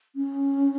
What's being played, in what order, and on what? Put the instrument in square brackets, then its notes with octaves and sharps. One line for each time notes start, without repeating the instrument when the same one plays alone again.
[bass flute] C#4